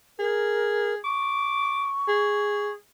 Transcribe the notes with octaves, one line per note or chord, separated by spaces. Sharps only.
G#4 A#4
C#6 D6
G#4